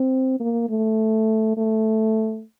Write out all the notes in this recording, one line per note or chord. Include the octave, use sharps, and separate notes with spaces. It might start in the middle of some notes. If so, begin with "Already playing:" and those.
Already playing: C4
A#3
A3
A3